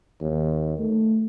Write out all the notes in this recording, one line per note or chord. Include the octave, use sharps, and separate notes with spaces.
D#2
A3